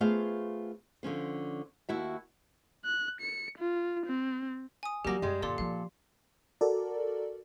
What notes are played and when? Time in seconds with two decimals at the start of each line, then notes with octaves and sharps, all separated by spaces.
0.01 A3 B3 F4 G#4 C5 F5
1.03 D3 F3 C#4 C5
1.89 D#2 E4 F#4 E5
2.85 F#6
3.21 C#7
3.58 F4
4.06 C4
4.83 G#5 D#6
5.05 E3 F#3 G3 A#3 F#4 G4 A#6
5.22 F#2 G3 G#3
5.42 F#2 A#2 D3 A4 D5 C6
5.58 F3 A#3 F5
6.61 F#4 A4 A#4 D5